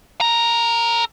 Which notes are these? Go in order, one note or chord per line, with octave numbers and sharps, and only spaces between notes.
A4 A#5